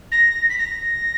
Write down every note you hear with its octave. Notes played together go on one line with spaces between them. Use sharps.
A#6
B6
A#6